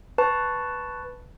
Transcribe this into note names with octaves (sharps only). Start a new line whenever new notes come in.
B4 A5 C#6